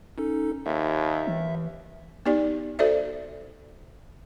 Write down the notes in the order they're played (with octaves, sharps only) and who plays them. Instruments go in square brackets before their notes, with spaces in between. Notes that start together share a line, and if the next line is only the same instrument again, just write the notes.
[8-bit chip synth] C#4 D#4 A4
[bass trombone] D#2 [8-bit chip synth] E5
[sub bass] E3
[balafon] B3 D#4 G4 D5
F#4 A4 C5 D5 E5